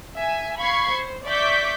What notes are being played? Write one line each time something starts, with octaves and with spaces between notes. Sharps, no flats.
E5 G#5
F5 B5 C#6 G#6 C7
C5
D5 E5 C#6 D6 G6 B6